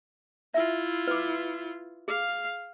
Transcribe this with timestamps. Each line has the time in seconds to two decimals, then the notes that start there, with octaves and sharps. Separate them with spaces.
0.54 E4 F4 E5
1.07 B4 D6
2.08 G#4 F5